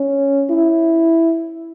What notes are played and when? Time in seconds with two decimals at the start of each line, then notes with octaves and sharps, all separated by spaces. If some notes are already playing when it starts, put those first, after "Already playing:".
Already playing: C#4
0.50 E4